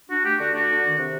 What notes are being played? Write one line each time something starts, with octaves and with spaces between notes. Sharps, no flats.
D4 F#4
A3 G4
D3 F#4
D4 F#4
D3
D#3
C3